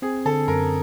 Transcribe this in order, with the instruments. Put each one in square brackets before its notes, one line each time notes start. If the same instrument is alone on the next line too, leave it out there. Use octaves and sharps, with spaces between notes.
[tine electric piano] C4 [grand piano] G#4
[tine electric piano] D3 [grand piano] A4
[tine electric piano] F#2 [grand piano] A#4